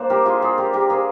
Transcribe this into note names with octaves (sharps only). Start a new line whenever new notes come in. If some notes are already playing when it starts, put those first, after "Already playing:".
Already playing: A#3 D4 C5
G4 A#4
F4 G#4
F4 G#4
G4 A#4
G4 A#4
G#4 C5